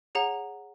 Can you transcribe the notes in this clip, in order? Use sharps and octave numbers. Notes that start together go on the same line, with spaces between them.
G#4 C#5 F#5 A#5